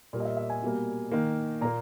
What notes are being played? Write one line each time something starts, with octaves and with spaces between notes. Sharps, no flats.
A#2 G3 A#3
D#5
E5
E5
G#5
B2 G3 A#3
D#3 A#3
A#2 A#3 A#5